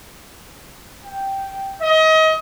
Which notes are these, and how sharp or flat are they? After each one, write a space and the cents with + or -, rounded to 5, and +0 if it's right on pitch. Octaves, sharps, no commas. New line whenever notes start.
G5 -5
D#5 +30